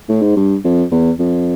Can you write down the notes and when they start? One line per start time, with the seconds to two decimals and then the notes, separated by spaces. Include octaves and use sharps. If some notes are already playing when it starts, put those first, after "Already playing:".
0.09 A2
0.22 G#2
0.37 G2
0.64 F2
0.92 E2
1.19 F2